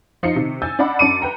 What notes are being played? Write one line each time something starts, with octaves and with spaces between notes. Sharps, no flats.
F3 D#4 F4 D#5 C7 C#7
C3 D#3
G#5 E6 G6 A6
D4 D5 D#5 F#5 B5
F#2 D4 A5 D6 C#7 D#7
B4 G5 A#5